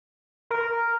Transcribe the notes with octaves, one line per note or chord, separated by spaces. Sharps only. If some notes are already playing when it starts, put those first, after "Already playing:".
A#4